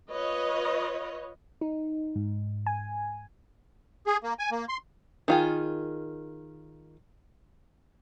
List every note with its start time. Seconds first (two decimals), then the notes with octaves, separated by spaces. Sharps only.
0.12 F4 B4 C#5 D#5
1.61 D#4
2.16 G#2
2.67 G#5
4.07 G#4
4.23 A#3
4.39 G#5
4.52 A#3
4.69 C6
5.28 D#3 F4 G#4